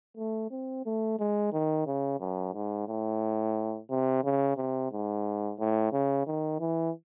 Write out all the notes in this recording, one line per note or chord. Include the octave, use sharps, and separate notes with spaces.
A3
C4
A3
G#3
D#3
C#3
F#2
G#2
A2
C3
C#3
C3
G#2
A2
C#3
D#3
E3